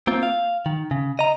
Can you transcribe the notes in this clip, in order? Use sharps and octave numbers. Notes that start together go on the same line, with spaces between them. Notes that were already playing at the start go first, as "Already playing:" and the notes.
A#3 C4 F4
F5
D#3
C#3
D#5 A#5